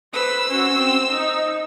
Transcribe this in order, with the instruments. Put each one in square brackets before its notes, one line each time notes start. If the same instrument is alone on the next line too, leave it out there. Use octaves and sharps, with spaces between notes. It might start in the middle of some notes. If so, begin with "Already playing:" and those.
[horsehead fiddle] B4 [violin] C5 E6
[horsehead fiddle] C#4 F#4
C4
D#4